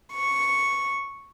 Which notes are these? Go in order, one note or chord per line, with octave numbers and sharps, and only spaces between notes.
C#6